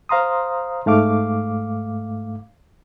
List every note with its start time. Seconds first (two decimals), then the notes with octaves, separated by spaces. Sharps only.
0.09 C5 F5 A#5 C6 D#6
0.86 G#2 A3 F5 D6